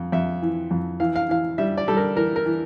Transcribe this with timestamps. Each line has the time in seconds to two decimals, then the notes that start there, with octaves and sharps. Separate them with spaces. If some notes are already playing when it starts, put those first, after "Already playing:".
Already playing: F2
0.12 F2 E5
0.42 E3
0.71 F2
1.00 E3 F5
1.16 F5
1.29 E3 F5
1.58 G3 E5
1.77 D5
1.88 G3 A4
1.97 A#4
2.16 E3 A#4
2.36 A#4
2.46 E3